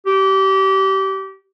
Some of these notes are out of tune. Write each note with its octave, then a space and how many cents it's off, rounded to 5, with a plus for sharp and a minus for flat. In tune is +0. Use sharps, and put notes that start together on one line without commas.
G4 -25